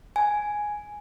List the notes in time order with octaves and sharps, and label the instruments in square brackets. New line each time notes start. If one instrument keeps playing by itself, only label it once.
[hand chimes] G#5